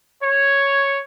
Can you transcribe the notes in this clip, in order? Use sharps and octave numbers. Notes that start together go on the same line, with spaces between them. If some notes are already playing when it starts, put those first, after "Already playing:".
C#5